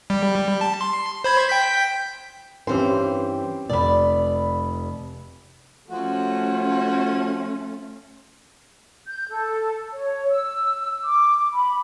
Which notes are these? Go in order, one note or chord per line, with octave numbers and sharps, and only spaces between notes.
G3
A5
C6
C5 B5 G#6
G5 G6 B6
G2 E3 C4 C#4 G4 C5
F1 D5 B5
F3 A3 C#4 F#4
G6
A4
C#5
E6
D6
B5